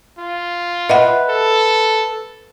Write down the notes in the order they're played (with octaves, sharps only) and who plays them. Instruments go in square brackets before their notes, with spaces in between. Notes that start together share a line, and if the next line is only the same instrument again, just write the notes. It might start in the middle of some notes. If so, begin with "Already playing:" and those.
[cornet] F4
[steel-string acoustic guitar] B4 [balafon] D#5 E5 F#5
[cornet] A4